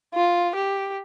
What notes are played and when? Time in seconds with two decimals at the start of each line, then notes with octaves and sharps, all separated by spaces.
0.14 F4
0.55 G4